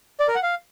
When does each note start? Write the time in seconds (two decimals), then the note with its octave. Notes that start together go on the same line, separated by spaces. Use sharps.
0.20 D5
0.28 A#4
0.35 F#5
0.43 F5